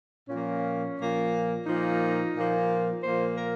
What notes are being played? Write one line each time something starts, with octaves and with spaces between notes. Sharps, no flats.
A#2 F3 A#3 C#4
A#2 F3 A#3
A#2 F3 A#3 D#4
A#2 F3 A#3
A#2 F3 A#3 C5
A#4